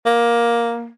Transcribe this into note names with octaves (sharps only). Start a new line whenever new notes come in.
A#3